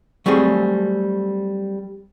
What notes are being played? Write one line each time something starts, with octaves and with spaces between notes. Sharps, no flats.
F#3 G3 A3 C4 G#4